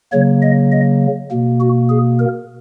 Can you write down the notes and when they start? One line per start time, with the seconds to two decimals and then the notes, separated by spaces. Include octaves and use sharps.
0.12 C#3 F#3 A#3 C#5
0.42 D#5
0.72 D#5
1.31 B2 A#3
1.60 F#4
1.90 G#4
2.19 A#4